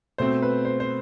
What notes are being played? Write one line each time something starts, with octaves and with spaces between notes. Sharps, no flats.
B2 A3 C4 C5
B4
C5
C5